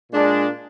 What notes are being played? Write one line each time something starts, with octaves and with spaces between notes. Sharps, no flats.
A#2 G#3 D4